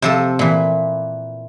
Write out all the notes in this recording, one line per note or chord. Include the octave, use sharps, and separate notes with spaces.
C3 F3 A4
A#2 E3